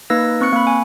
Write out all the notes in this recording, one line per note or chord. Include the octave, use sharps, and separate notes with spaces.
A#3 D#4 B4 E6 A#6
C4 C#6 F#6 C#7
A#3 B5
G#5